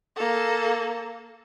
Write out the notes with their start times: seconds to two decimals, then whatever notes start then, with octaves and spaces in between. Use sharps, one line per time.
0.16 A#3 A4